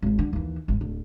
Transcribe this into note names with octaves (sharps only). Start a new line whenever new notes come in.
G#1 G#2
D3
D#2 E3
G#1
D1